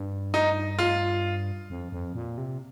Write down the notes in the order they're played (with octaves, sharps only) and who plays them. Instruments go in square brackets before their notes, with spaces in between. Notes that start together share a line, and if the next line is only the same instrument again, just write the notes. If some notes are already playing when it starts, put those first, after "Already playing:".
Already playing: [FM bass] G2
[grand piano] D#4
F4
[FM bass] F2
F2
A#2
C3